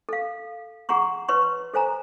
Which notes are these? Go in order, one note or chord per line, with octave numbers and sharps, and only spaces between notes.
A4 F5
G#4 F#5 A#5 C6 C#6
B4 C#5 C6 C#6
A4 C5 G#5 A#5